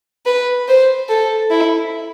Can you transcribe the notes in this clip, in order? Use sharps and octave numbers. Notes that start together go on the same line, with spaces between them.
B4
C5
A4
E4